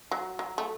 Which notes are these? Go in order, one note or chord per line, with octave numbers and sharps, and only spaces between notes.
F#3
F#3
A3